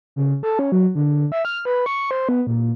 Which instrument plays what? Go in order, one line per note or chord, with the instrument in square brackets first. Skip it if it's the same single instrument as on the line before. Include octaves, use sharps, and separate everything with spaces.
[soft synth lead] C#3
A4
C#4
F#3
D3
E5
F6
B4
C#6
C5
B3
A#2